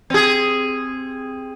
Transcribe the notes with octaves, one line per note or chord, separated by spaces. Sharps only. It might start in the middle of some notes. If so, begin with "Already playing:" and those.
C4 G#4